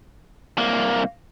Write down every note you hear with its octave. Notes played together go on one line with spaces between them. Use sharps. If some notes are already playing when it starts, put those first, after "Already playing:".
C2 A#3